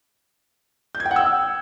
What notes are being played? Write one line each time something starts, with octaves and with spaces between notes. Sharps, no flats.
G6
G#6
G5
F#5
E6